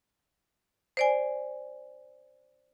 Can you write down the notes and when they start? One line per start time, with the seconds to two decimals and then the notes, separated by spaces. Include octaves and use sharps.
0.97 C5 D5 G#5